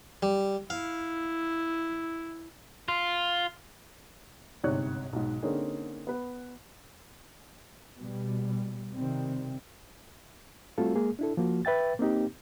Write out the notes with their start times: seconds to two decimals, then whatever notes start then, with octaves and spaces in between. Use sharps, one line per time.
0.23 G3
0.70 E4 F5
2.88 F4
4.64 G1 G#2 C3 C#5 F#6
5.13 B1 G#2
5.42 D3 A#3 C4 C#4 D#4 G#4
6.07 B3 B4
7.97 B2 G3
8.95 C3 D#3 G3 C4
10.78 G3 A3 C4 F4 F#4 A4
10.95 G#3 A#3 G#4
11.19 D4 E4 A4
11.37 F3 A#3 F#4
11.65 B4 E5 G5 A6
11.99 A#3 C4 D#4 G4